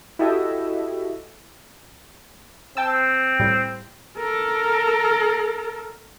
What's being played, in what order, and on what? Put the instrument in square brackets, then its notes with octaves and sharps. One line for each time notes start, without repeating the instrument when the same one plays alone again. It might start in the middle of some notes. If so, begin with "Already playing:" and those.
[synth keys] E4 F#4 G4 A4 D#5 E5
[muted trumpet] C4 [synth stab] G5 A5 E6
[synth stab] A2 G3
[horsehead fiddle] A4 A#4